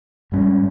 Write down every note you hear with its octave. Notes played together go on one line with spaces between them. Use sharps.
G#2 G3 C#4